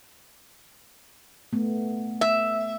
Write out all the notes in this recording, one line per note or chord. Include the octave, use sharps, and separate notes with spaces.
A3 B3
E5